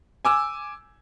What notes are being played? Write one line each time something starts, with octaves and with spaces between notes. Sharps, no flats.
G#5 D6 E6